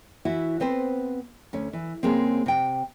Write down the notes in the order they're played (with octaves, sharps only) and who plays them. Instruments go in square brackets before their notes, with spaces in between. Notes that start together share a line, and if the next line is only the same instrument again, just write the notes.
[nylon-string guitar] E3 E4 F#4
B3 C4 B4 C5
D2 C#4
E3
C#3 G#3 A#3 C4
C3 G5